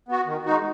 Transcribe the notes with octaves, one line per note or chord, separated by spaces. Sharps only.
B3 F#4
D#3
G#3 D#4 F#4